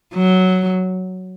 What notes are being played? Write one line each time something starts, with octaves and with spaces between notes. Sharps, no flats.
F#3